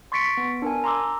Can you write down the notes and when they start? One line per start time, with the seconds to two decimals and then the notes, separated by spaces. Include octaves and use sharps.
0.12 C6 C#6 A6 B6 C#7 D7
0.37 B3
0.62 D4 A#4 G#5
0.84 A#5 C6 D6 E6